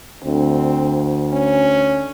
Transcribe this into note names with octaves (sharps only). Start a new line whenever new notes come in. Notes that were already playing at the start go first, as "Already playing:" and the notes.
D2 C4
C#4